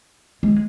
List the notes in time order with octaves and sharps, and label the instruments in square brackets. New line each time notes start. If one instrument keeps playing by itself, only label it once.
[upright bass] G#3